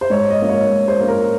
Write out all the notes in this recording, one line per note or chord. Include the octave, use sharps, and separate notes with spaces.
C5
G#2 C#5
D#5
F3 A#3 C#4
C#5
G#2
C5
F3 A#3 C#4
A#4